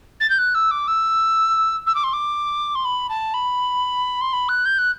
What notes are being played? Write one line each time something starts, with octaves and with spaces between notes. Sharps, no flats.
A6
G6
F#6
E6
D6
E6
E6
D6
C6
D6
C6
B5
A5
B5
C6
B5
F#6
G6
F#6